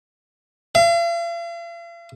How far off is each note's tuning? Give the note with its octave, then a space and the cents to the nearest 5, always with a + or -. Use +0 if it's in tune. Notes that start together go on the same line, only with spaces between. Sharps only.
F5 -45